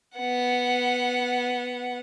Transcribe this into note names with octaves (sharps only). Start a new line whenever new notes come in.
B3 F#5